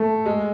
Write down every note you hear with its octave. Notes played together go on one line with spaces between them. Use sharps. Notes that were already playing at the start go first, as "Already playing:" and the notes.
Already playing: A3
G#3